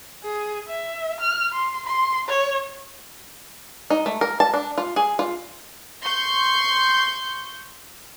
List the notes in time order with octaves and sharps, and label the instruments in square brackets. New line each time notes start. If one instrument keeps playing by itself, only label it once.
[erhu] G#4
E5
F6
C6
C6
C#5
[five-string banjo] D#4
A3
A#4
A5
D4
F4
G#4
F4
[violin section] C6 C#6 G6